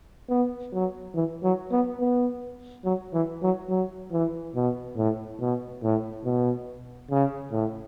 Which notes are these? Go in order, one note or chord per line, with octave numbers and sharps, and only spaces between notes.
B3
F#3
E3
F#3
B3
B3
F#3
E3
F#3
F#3
E3
B2
A2
B2
A2
B2
C#3
A2